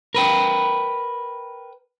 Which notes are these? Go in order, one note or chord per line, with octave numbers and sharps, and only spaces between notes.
A#4 B4 G5